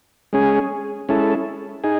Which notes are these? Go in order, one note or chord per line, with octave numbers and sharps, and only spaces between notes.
G#3 C#4 G#4
G#3 C#4 E4 A4
D#4 G#4